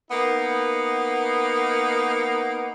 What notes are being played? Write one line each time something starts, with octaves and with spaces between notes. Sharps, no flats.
A#3 B3 D#4